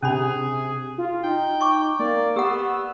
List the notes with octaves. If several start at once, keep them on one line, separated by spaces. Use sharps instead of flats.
C3 C#4 D4 G#4 B5
F4
D#4 G5
C#6 D6
A#3 D5
B3 G4 F#5 E6